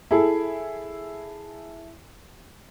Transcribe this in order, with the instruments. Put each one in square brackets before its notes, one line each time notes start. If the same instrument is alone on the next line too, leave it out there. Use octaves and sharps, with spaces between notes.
[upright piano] E4 G#4 A4